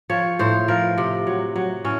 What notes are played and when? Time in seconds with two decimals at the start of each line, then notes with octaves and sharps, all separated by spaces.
0.10 F3 C#5
0.39 A2 C5
0.68 F3 A#4
0.98 C3
1.27 F#3
1.56 F#3
1.84 A2 C#4